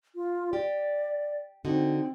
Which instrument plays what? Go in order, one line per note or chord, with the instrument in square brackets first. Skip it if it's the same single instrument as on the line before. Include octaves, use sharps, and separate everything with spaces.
[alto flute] F4
[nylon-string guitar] G4 [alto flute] D5
[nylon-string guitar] D3 D#4 F#4 [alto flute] C4